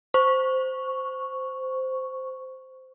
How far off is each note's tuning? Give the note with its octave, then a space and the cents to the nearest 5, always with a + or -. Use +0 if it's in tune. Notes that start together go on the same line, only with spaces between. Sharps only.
C5 -10 C#6 +0